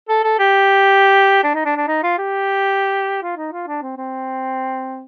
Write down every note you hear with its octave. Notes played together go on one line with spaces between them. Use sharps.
A4
A4
G4
D4
D#4
D4
D4
D#4
F4
G4
F4
D#4
F4
D4
C4
C4